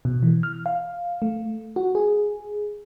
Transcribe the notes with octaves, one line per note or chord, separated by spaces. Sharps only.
B2
E3
F6
F5
A3
F#4
G#4